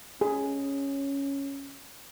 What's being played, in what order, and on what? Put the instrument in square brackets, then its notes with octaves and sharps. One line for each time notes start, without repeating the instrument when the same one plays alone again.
[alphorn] C#4 [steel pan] G#4